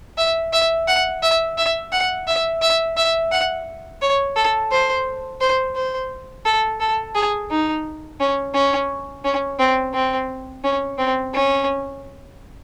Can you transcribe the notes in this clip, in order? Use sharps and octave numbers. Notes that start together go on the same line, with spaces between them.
E5
E5
F#5
E5
E5
F#5
E5
E5
E5
F#5
C#5
A4
C5
C5
C5
A4
A4
G#4
D#4
C#4
C#4
C#4
C4
C4
C#4
C4
C#4